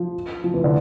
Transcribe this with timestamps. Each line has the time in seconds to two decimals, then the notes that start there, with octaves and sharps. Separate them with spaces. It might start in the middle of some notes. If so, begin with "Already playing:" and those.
Already playing: F3
0.44 F3
0.54 E3
0.64 D3